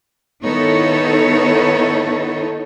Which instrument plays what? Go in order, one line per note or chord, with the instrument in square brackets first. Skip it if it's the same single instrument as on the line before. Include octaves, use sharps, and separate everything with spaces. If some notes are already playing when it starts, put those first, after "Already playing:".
[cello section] D#3 B3 D#4 E4 A4 C#5